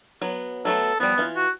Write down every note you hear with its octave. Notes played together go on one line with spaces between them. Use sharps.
F#3 B3
F#3 A3 B3 A4
F3 G3 B3
E3 F4
F#4